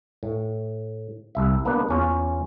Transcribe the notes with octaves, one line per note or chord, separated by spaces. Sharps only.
A2
C2 E5
A#3 B3 D4 D#4 B4
E2 C#4 F4